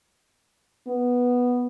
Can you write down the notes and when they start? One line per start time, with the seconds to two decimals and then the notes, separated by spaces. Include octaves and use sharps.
0.87 B3